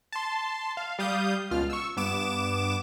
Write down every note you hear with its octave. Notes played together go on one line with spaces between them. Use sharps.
A5 C6
F5
G3 F5 D#6 G6
C#2 B2 F4 F6
C#6 E6
G2 B3 D6 E7